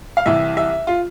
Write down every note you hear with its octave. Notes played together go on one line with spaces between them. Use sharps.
F5
C2 C3 E3 G3 E5
E5
F4